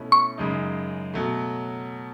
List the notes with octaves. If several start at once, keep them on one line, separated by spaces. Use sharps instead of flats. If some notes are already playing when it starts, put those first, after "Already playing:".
Already playing: B2 A3 C#4 E4
C#6
F#2 C#3 G#3 D#4
B2 F#3 A3